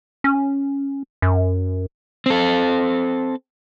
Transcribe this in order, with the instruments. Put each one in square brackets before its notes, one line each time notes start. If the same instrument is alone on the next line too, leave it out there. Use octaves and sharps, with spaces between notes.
[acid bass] C#4
F#2
[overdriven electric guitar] C4 A4